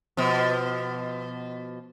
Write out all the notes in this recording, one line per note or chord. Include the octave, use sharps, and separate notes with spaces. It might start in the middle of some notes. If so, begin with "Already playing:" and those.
B2 F3